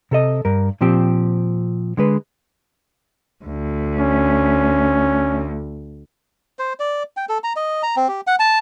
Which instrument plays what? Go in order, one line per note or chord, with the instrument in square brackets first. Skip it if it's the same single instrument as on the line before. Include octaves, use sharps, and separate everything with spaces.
[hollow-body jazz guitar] C3 A4 D#5
G2 A#4
A#2 F3 C4 G4
D3 G#3 B4
[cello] D2
[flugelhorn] C#4
[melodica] C5
D5
G5
A4
A#5
D#5
A#5
C4
G4
F#5
A5